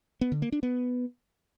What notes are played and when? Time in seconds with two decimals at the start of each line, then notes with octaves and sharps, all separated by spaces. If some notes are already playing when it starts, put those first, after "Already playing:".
0.21 B3
0.32 D3
0.42 A#3
0.52 D4
0.63 B3